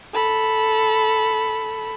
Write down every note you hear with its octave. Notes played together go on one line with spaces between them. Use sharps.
A4 B5